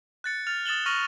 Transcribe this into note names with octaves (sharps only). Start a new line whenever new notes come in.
F#6 A6 C#7
F6 A6 F7
D#6 A6 E7 F#7 G7
C#6 F6 A#6 D#7 F7 F#7